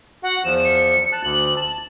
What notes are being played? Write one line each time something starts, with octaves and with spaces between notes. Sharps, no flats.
F#4 F#5
E2 F3 E7
C#7
A5 F#6
D2 F#7
A5